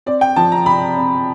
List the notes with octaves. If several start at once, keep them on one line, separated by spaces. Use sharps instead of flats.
C4 D5
G5
F3 A5
A#5
C3 B5
C4